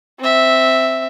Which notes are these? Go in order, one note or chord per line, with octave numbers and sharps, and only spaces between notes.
C4 E5